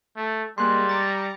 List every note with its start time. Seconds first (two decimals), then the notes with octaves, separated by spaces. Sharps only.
0.17 A3
0.58 G3 G#3 A#3 C6 F#6
0.89 A#5 D6 A6 C#7